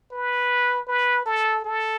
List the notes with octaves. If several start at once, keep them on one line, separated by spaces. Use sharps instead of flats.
B4
B4
A4
A4